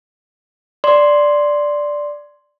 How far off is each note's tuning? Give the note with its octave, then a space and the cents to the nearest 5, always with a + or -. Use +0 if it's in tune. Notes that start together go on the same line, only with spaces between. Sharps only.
D5 +0 C6 +0